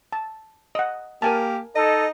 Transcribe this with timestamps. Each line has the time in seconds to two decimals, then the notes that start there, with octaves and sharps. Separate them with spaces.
0.12 A5
0.75 D#5 F#5
1.22 A#3 G4 A#4 G#5 A5
1.76 D#4 A4 D#5